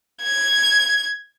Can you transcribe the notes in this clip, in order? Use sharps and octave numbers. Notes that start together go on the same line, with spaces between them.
G#6